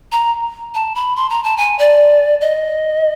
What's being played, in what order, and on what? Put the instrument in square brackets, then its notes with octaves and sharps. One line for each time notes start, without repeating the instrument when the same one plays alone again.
[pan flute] A#5
A5
B5
C6
A#5
A5
G#5
D5
D#5